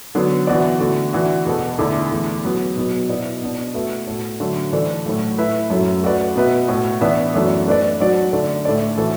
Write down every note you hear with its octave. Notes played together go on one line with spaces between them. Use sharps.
D3 F#3 B3
E3 B3 F#4 D5
D3 A3 F#4
E3 D4 F#4
E2 B2 B3 F#4 A4
E2 D3 A3 E4
E2 E3 A3
F#3 B3 F#4
B2 F#3 B3
B2 B3 E4 D5
B2 B3 D4
A3 F#4 B4 E5
A2 A3 F#4
D3 F#3 A3 D4
E3 A3 D4 A4 D5
A2 F#3 A3 F#4
A3 E4 B4 E5
F#2 F#3 A3
A3 F#4 B4 D5
B2 B3 F#4 B4 E5
A2 A3 F#4
E3 B3 D4 B4 E5
F#2 E3 A3 D4 F#4
A3 D4 B4 D5
F#3 D4 F#4 D5
D3 A3 D4
A2 A3 D4 A4 D5
E3 A3 F#4 A4 E5